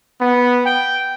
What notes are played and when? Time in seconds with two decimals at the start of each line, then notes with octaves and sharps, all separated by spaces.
0.21 B3
0.65 G5